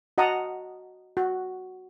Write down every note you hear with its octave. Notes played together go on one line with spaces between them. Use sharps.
F#4 D#5 F#5 A5 A#5 D#6
F#4